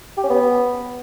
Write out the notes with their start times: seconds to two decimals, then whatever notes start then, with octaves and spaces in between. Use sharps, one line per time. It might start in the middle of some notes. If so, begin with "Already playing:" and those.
0.18 G4
0.24 C#4
0.30 B3